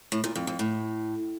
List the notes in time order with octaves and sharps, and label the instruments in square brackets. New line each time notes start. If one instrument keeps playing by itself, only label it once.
[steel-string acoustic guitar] A2
A#2
F2
F2
A2